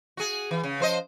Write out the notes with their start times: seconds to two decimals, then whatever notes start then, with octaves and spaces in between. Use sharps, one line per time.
0.17 F#4 G#4
0.51 E3
0.63 C#3
0.80 F3 C5 D#5